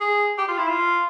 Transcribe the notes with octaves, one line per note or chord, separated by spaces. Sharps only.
G#4
G4
F4
E4
F4